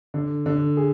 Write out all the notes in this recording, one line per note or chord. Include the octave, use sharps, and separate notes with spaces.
D3
D3
G#4